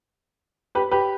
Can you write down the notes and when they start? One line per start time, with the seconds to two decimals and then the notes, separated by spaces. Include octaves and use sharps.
0.75 G4 B4
0.91 G4 B4